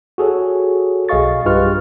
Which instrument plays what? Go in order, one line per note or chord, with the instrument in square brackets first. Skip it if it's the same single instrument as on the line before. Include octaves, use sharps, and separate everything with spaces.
[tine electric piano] F#4 G#4 A4 C#5
B1 G#4 D#5 F5 C#6 A6
G2 F4 G4 B4 C#6 F6